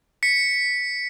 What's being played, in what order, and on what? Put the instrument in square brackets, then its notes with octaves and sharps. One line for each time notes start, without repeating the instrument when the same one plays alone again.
[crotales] B6 C#7